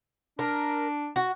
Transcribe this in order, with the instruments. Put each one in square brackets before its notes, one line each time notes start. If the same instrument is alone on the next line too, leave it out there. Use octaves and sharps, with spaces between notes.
[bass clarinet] D4 [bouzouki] A#4
[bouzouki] F#4